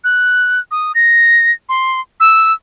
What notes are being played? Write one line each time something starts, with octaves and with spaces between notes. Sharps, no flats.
F#6
D#6
A#6
C6
E6